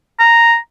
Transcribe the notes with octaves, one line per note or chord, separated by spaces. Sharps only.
A#5